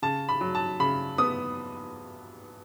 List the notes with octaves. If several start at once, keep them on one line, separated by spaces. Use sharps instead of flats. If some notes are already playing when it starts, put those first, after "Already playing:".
C#3 A5
B5
F#3
A5
C#3 B5
B3 D#6